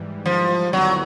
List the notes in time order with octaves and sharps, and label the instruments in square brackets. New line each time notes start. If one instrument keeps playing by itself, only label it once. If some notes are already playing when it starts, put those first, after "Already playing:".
Already playing: [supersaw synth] G#2 E3 G3
[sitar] F3
[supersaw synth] D#2 D3 G3 B3 E4 [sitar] F#3